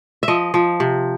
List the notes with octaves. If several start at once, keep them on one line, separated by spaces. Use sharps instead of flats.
E5
F3 D#5
F3
C3